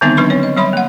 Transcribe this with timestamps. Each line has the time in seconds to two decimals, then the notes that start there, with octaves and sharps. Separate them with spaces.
0.01 D3 D#3 G3 B3 C4 D#4
0.17 F#3 D4 B4 C6 C#6
0.30 C4 C#5
0.43 D#5
0.57 F#3 G3 C#5 B5 C6
0.73 A#3 F#5